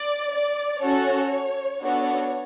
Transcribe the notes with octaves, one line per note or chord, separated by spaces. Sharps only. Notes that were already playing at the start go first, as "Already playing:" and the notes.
Already playing: D5
D5
C#4 F#4 A4 C#5
B3 D4 F#4 A4 C#5